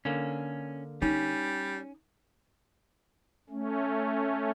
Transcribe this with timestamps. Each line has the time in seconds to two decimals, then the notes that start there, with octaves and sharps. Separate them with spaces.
0.05 D3 A#3 C#4
1.02 G3 C#4 D#4
3.50 A3 C#4